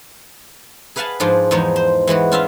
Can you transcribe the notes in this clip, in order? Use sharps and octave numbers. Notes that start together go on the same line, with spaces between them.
G#4 B4 F5 F#5 G#5 A5
G#2 F3 D4 G#4
E2 F3 G#3 D#4 C5 C#5
C5
E3 G#3 B3 F#4
C#4 F4 E5 F5